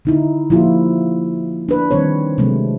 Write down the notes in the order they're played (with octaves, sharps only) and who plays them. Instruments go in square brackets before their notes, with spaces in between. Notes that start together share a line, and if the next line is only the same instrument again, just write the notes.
[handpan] D3 D#4 E4
F3 A#3 E4 F4 G4
D4 B4
D#3 G3 C4 C5 C#5
C3 F#3 G#3 A3